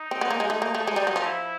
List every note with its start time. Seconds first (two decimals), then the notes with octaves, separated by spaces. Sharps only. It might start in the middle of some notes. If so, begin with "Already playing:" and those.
Already playing: D#4
0.11 C4
0.21 B3
0.31 A#3
0.40 G#3
0.49 A3 D#4
0.62 A#3
0.75 A3
0.87 G#3
0.96 G3
1.07 F#3
1.16 F3
1.25 E4